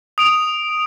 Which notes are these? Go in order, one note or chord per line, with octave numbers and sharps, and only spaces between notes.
D#6 D7 F7